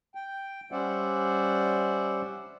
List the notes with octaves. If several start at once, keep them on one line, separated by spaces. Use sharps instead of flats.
G5
G3 C#4 C5 D5 E5 F#5